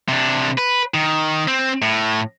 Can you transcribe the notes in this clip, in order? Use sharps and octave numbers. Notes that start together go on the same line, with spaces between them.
C3 D4
B4
D#3
C4
A2